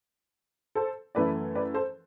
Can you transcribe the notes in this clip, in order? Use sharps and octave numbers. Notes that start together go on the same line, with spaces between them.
A4 C5
F#2 E3 A3 B4 D5
B4 D5
A4 C5